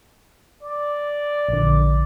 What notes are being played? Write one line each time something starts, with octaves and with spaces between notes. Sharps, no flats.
D5
A#1 D3